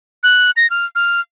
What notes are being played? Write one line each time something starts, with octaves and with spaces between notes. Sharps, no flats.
F#6
A#6
F6
F6